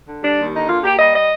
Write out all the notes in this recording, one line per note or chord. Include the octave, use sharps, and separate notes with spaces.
D3
G3 D4
D#2
D3 D#4
A#3 F4
A#3 G4
G3 D#5
D#5